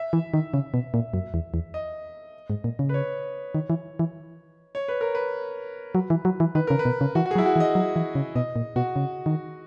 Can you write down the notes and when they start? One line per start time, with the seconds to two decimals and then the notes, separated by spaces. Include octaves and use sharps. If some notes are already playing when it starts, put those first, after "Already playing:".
Already playing: E5
0.13 E3
0.34 D#3
0.54 C#3
0.74 B2
0.94 A#2
1.14 F#2
1.34 E2
1.54 E2
1.74 D#5
2.50 G#2
2.64 A#2
2.79 C#3
2.89 B4
2.94 C#5
3.55 D#3
3.70 E3
3.99 E3
4.75 C#5
4.88 B4
5.01 A#4
5.15 B4
5.95 F#3
6.10 E3
6.25 F#3
6.40 E3
6.55 D#3 B4
6.67 C#3 A#4
6.79 B4
6.85 B2
7.01 C#3
7.15 E3 F#4
7.26 F#4
7.31 F#3 G#4
7.38 E4
7.46 F#4
7.56 E3
7.60 D#5
7.75 F#3
7.96 E3
8.15 C#3
8.36 B2 D#5
8.56 A#2
8.76 B2 F#4
8.96 C#3
9.26 D#3